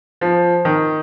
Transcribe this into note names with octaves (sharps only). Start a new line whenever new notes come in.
F3
D#3